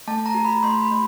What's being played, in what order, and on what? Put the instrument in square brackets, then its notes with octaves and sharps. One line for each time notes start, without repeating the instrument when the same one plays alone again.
[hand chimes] A3 A5
A#5
F#4
B5
A3 C6
B5
A3